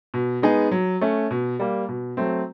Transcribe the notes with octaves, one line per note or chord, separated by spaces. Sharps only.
B2
G#3 B3 D#4 G#4
F#3
A3 C#4
B2
G3 A#3
B2
F#3 A3 C4